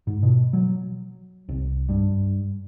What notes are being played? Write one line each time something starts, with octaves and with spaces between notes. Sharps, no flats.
G#2
B2
F#3
C2
G2